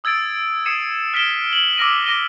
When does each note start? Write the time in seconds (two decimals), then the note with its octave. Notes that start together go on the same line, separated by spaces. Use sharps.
0.04 D#6 E6 G#6 A6 D7
0.66 D#6 G#6 C7 C#7 D#7 E7
1.14 F6 B6 D7 E7 G7
1.53 F#7
1.77 D6 E6 F6 A#6 D7 D#7
2.06 D6 A#6 D#7 G7